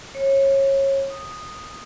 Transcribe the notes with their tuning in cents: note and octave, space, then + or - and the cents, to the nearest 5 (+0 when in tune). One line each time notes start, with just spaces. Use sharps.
C#5 -25
D#6 -10